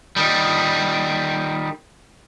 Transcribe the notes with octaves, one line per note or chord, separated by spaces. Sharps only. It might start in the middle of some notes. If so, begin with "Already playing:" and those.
D#3 G3